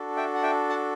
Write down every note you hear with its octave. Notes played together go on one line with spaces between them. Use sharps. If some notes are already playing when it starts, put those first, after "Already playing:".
Already playing: D4 F#4 A4
E5 G5
F#5
E5 G5
F#5 A5